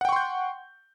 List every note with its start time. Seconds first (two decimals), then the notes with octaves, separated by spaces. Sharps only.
0.01 F#5
0.05 G5
0.09 C#6
0.12 C6
0.16 G6